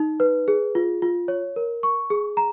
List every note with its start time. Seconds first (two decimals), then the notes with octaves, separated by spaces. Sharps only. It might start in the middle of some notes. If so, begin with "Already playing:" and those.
Already playing: D#4
0.20 B4
0.48 G#4
0.75 F4
1.02 F4
1.28 C#5
1.56 A#4
1.83 C#6
2.10 G#4
2.37 A#5